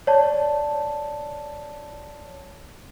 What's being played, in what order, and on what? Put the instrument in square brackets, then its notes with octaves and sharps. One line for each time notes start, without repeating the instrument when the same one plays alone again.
[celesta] C#5 D5 A5